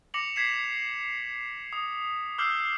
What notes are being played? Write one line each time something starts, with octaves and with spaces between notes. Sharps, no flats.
D6 A#6 C#7 F7 F#7
G#6 B6 C7 E7
C7
D#6
D6 E6 F6 G6 C7 F#7